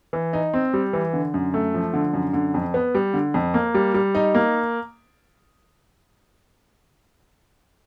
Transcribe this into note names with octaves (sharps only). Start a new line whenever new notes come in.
E3
D#4
C4
G3
E3
D3
F#2
A3
F3
D3
F#2
D3
F2
B3
G3
D3
F2
A#3
G3
G3
D#4
A#3